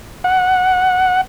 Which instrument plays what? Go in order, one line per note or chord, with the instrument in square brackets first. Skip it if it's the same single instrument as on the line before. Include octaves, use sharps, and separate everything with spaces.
[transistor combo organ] F#5